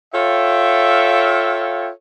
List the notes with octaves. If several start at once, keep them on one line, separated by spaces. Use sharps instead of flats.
F4 A4 C#5 E5 F5 G5